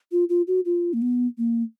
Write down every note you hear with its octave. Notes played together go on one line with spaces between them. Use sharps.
F4
F4
F#4
F4
A#3
B3
A#3